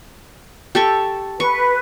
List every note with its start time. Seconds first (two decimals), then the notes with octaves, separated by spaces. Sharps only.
0.75 G4 A4 C#6
1.40 B4 C#6